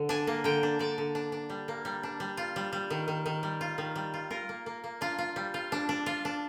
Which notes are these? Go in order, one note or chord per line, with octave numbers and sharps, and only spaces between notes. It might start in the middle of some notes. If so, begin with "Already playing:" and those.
Already playing: D3
D4 G#5
A#3
D3 G5
D4
D3 D5
D3
D4
D4
G3
A#3
G3
D4
G3
F4
G3
G3
D#3
D#3
D#3
G3
F4
D#3
G3
F4
F4 A#4
A#3
A#3
A#3
D4 F4
F4
G3
F4
D4
D4
F4
D4